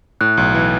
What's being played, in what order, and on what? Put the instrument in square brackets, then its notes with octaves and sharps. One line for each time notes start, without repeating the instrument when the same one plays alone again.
[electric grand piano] A2 [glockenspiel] F#6
[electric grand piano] B1
E3